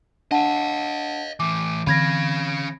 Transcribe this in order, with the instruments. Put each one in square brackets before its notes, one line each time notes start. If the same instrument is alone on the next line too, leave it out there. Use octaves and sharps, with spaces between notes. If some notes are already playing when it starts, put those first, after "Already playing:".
[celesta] D4 F#5 A5 [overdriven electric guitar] D#5 F5
[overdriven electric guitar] A2 E3 [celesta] D6
[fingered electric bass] D3 E3 C4 [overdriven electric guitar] C#4 F5 [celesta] B5 G#6 A#6